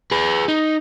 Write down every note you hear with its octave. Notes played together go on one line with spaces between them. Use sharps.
G#4 B4
D#4